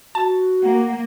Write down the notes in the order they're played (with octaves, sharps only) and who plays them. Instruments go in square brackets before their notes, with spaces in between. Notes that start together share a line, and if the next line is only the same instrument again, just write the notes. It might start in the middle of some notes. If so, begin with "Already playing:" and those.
[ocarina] F#4 [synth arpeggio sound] A5
[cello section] A#3 [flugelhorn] F#5